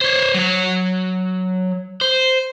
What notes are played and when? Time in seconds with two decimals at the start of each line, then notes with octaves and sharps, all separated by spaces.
0.01 C5 C#5
0.35 F#3 C#5
2.01 C5